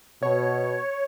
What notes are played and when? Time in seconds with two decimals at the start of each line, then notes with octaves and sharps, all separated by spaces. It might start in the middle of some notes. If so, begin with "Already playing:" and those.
0.23 B2 C#5